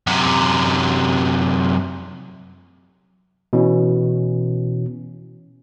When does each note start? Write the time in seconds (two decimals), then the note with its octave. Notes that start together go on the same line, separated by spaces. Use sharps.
0.07 F#2 C3
3.53 B2 E3 C#4